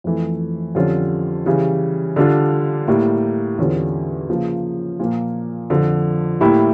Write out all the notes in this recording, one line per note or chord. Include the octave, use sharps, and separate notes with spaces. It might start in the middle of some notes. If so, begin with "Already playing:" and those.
F2 E3 A3
F2 D3 G3 C#4 F4
C#3 E3 G3
D3 G3 D4 F4
A2 G3 A#3
E2 D3 G3 C#4 F4
C#3 F3 A#3
A#2 F3 A#3
F2 D3 F3
A2 G3 A#3 E4 G4